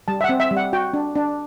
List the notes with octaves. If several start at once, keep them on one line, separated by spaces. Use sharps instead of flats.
G3 A5
E5
F#5
C4
E5
G3
F#5
F#4 G5
D4
D4